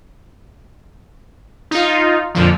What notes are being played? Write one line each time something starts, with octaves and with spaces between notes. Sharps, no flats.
D#4 F4
F2 A#2 D3 F3